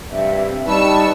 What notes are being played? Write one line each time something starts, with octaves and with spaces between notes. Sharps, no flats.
G2 C3 C4 E5
G3 D#4 B4 A5 C#6 E6 C#7